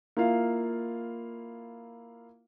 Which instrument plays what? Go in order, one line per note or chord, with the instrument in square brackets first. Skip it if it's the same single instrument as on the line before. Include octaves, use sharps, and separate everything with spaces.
[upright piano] A#3 E4 F4 F5